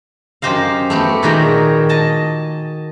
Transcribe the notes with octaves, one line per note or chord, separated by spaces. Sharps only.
F#2 G4 C5 D#5 F5
A3 B3 G4
A#2 D#3 F#4 G#4 G5 A#5
D#5 A5